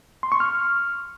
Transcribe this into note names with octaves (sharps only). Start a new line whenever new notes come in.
C6
C#6
F6